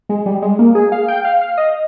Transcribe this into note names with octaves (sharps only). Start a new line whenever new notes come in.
G#3
G3
G#3
A#3
G#4
F5
G5
F5
F5
D#5